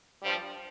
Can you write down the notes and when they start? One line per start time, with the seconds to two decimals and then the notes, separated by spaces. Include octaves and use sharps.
0.23 G2 F3 G3